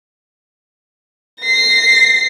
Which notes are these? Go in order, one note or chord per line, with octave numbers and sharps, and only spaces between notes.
A#6 C7